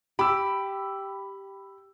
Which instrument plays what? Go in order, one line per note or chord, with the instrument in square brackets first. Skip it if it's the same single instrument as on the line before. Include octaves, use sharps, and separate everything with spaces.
[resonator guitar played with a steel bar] G4 [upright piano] B5 E6